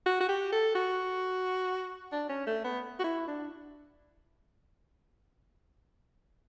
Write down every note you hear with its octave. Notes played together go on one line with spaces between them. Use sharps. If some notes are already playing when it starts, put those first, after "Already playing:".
F#4
F#4
G4
A4
F#4
D4
C#4
A3
B3
F#4
E4
D4